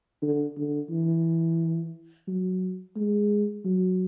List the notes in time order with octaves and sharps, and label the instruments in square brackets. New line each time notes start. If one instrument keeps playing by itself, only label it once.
[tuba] D3
D3
E3
F#3
G#3
F#3